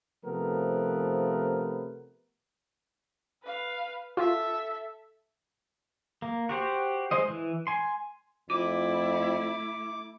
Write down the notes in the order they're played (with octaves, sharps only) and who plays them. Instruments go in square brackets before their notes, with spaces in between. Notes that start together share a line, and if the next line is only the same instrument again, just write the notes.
[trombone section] C3 F3 A3 B3 A#4 B4
[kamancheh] B4 F5
[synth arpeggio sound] F4 [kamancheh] A4 E5
[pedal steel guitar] A#3
F#4 G4 C5
G#3 C5 D#5
E3
G#5 C6
[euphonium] F2 [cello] A3 E4 [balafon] F4 [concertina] D6